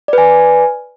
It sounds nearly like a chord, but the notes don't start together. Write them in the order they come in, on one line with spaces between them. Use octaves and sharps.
D5 B4 G#5